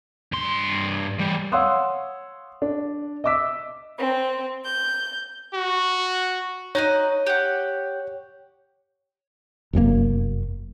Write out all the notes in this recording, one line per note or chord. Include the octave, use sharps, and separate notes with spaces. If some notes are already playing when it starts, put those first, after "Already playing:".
G2 C6
E3 G3
C#5 F5 F#5 C6 D#6 E6
D4
D#5 E5 D6 E6 B6
C4
G6
F#4
D#4 F#4 C#5 D#5
G4 F#5
F1 F#2 B2 A#3